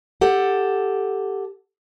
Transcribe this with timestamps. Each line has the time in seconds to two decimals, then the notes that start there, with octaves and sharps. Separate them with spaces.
0.21 G4 A4 F#5